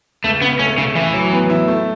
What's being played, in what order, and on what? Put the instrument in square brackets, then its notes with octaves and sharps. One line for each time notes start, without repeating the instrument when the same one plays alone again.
[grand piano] C#2 [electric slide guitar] A3
[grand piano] C#3 [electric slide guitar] B3
[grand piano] A3 [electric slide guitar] C#4
[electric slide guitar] C#3 [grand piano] A3
[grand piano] A2 [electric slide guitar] E3
[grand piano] F#3
B3
E4
A3